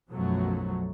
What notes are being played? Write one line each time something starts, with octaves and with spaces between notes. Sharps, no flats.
B1 F#2 B2 F3 F#3 A3